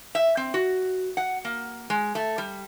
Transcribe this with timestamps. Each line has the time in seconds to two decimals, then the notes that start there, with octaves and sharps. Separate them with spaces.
0.15 E5
0.37 C4
0.54 F#4
1.17 F#5
1.45 A#3
1.90 G#3
2.15 A3
2.38 G3